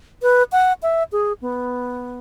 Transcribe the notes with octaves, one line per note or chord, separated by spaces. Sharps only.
B4
F#5
E5
G#4
B3